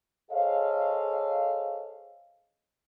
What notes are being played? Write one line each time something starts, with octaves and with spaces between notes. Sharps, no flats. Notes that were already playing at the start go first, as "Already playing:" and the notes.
G#4 A4 C5 C#5 D#5 F5